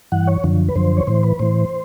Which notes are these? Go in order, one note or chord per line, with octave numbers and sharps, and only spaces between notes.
G2 E3 F#5
C#5
F#2 D3 F3
B4
F#2 D3 F3 C5
C#5
A2 E3 C5
B4
A2 E3 C5